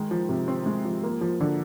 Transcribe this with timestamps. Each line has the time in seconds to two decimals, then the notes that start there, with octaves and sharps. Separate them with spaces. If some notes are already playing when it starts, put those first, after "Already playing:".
Already playing: D#3 G#3
0.11 F3
0.29 C3
0.48 C4
0.66 G#3
0.85 F3
1.03 A#3
1.21 F3
1.40 D3